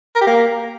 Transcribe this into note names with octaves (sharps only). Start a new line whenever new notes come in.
A#4
G4
A#3